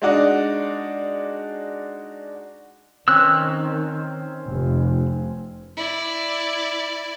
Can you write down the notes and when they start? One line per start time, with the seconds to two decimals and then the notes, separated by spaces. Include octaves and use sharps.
0.02 G#3 D4 D#4 F#4 D5 F#5
3.08 D#3 C4 C#4 E6 F#6
4.48 F1
5.77 E4 D5